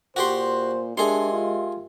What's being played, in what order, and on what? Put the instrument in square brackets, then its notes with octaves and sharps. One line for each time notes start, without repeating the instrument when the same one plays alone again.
[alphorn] A#2 [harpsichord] F#4 G4 C6 [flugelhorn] C5
[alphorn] G#3 [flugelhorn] D4 [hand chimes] G4 A#4 E5 [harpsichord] G#4 C6
[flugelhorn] F4